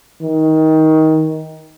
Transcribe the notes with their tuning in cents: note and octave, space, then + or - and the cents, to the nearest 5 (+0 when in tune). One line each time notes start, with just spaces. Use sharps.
D#3 +20